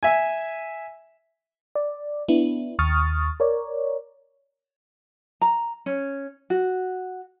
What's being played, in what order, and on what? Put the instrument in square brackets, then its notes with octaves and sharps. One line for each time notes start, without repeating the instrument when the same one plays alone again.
[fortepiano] E5 G#5
[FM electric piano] D5
B3 D4 E4
D#2 C#6 D#6 F6 A6
A#4 C#5 D5
[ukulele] A#5
C#4
F#4